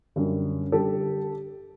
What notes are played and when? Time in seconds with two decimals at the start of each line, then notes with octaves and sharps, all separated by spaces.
0.16 F#2 D3 G3
0.72 D3 G3 G4 A4